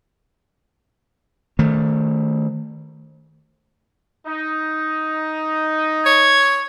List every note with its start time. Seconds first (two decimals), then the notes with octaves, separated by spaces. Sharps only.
1.59 D#3 A3
4.27 D#4
6.06 C#5 G#6